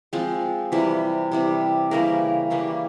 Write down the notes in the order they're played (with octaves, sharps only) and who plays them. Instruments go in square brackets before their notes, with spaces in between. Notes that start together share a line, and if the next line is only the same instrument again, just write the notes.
[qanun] F3 G#3 C4
C3 E3 G3
C3 E3 G3
C#3 E3 G3 A#3 A#4
C#3 E3 G3 A#3